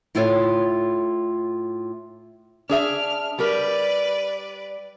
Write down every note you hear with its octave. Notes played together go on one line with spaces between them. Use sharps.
A2 E4 F4 A4 C5 C#5
D4 G#4 E5 F6
G3 G4 A#4 B4 D5